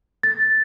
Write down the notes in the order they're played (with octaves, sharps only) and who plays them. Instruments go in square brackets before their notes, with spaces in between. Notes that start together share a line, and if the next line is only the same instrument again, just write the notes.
[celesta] A6